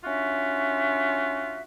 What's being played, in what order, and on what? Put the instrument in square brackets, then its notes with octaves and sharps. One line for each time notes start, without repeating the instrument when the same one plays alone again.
[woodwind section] C#4 D4 F4 F#4 E5